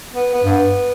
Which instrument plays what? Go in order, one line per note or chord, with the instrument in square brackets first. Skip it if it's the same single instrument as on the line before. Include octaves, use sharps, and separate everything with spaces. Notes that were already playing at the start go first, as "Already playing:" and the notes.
[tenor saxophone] B3
B3
[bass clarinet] G2
[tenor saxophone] B3